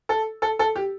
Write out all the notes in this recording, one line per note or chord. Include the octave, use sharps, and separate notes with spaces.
A4
A4
A4
G4